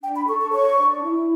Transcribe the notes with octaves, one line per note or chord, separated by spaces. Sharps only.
D4 G5
B5
A4 C#6
C#6
C#5 C#6
D4
E4